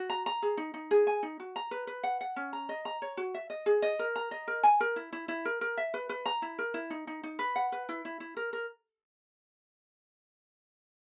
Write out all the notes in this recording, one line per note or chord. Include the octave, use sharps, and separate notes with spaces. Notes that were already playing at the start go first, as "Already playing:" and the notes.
Already playing: F#4
A#5
A#5
G#4
D#4
D#4
G#4
G#5
D#4
F#4
A#5
B4
B4
F#5
F#5
C#4
A#5
D#5
A#5
C#5
F#4
E5
D#5
G#4
D#5
A#4
A#5
D#5
A#4
G#5
A#4
E4
E4
E4
A#4
A#4
E5
B4
B4
A#5
E4
A#4
E4
D#4
D#4
D#4
B4
F#5
B4
E4
E4
E4
A#4
A#4